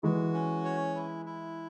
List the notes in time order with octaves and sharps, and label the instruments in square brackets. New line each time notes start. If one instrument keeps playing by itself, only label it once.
[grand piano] E3 G#3 [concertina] F#4
[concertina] C#4
C#5
E4
E4